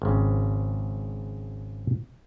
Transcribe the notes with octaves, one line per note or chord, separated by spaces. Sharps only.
G#1 C#3